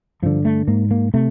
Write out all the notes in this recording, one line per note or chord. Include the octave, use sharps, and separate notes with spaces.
G2 D3 F3
A3
G#2 A#3
A#3
C3 A3